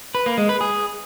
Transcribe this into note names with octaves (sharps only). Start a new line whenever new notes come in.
B4
A#3
G#3
B4
G#4